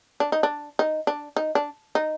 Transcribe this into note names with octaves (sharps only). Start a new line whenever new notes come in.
D4
D#4
D4
D#4
D4
D#4
D4
D#4